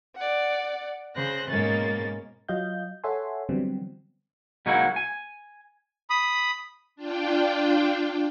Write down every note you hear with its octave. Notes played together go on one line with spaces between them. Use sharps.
D5 F#5
C#3 C5 F#6 A#6
G#2 B2 G#3 A#3 C#4 A6
F#3 F4 D#5 F5 G6
A4 C#5 E5 F#5 G#5 C6
D3 E3 F#3 G3 B3 C4
B2 F#3 G#3 A#3 D#4 E4
G#5
B5 D#6
D4 F4 G5